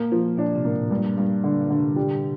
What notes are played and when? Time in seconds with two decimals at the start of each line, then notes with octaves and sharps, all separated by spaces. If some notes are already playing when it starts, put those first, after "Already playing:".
Already playing: A#2 A#3
0.12 F3
0.38 A#2 D4
0.55 C3
0.65 A2 A#3
0.73 A#2
0.91 G2
1.17 G2
1.44 D3
1.62 A#2
1.70 D3
1.79 C3
1.96 G3